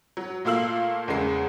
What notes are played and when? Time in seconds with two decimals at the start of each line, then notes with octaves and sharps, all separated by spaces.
0.17 F#3
0.45 A#2 A3 A#3 F5 E6 F#7
1.08 E2 C#3 G#3 C7